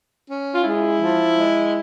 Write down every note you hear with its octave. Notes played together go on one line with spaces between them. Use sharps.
C#4
F4
G#3 E4
F3
G#3